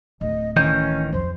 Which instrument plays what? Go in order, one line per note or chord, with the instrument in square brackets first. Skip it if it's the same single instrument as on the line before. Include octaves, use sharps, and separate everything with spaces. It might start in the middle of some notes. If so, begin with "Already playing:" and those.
[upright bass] D1 [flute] D#5
[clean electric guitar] D#3 E3 D#4 [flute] C#4 [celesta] G6
[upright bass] F2 F3 [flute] C5